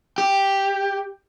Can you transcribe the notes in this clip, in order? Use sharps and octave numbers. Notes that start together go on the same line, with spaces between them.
G4